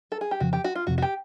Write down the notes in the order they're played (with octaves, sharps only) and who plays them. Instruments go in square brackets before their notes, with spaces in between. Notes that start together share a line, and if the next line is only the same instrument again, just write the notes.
[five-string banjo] A4
G#4
G4
[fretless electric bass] F2 C#3 F3 [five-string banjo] F#4
[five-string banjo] G4
F#4
F4
[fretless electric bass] F1 F2 C3 [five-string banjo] F#4
[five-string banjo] F#4
G4